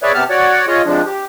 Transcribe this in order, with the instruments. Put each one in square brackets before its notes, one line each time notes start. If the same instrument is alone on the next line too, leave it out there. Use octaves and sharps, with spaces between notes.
[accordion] G#4 B4 C#5 D5 E5
C3 B3 G4 A5 F6
F#4 C#5 D5 F#5
F4 G#4 C#5 D#5
C3 F3 G#3 D4
G4